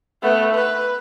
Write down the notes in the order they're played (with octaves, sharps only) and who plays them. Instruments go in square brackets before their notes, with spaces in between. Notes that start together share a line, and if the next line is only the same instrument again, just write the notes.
[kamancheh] A3 B3
B4